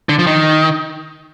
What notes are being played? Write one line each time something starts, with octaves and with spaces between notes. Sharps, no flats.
D3
F3
D#3